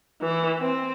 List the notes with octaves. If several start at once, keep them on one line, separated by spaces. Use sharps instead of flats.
E3
C4